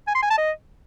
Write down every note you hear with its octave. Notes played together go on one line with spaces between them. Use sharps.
G#5
C6
G#5
A5
D#5